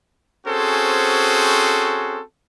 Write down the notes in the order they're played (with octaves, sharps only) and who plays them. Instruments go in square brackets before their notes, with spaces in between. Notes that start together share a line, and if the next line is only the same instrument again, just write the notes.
[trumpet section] C4 C#4 F#4 G#4 A4 C5